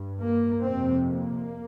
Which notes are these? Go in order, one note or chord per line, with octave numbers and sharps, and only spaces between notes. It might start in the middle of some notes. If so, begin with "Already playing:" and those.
Already playing: G2
A#3
F2 C3 C4
A#3